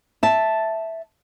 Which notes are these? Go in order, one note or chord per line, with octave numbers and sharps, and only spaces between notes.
E5 A5